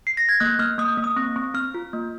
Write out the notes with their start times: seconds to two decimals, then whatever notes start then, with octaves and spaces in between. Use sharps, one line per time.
0.07 C7
0.17 A#6
0.29 G#6
0.40 A#3 F#6
0.59 A#3 F6
0.78 A#3 D#6
0.98 A#3
1.04 D#6
1.16 C4
1.36 C4
1.54 C4 F6
1.74 F4
1.93 A#3